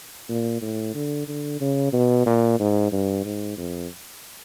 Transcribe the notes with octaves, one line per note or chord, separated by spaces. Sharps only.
A#2
A2
D3
D3
C#3
B2
A#2
G#2
G2
G#2
F2